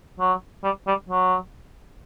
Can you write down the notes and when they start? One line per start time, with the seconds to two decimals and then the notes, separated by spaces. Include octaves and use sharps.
0.20 F#3
0.64 G3
0.87 G3
1.09 F#3